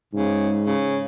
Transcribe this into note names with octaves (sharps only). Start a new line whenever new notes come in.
G#2 C#3
C#3